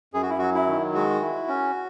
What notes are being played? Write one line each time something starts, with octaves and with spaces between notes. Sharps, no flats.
F#2 G#4
F#4
E4
F#3 F#4
E4
D#3
G#3 F#4
E4
C#4